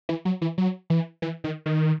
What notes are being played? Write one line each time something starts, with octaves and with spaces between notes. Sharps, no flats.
E3
F#3
E3
F#3
E3
E3
D#3
D#3